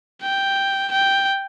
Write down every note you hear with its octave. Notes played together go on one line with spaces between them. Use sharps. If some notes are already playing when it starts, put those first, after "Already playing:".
G5
G5